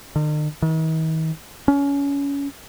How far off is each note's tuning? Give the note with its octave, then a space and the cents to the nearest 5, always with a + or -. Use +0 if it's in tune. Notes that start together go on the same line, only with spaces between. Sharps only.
D#3 -45
D#3 +45
C#4 +25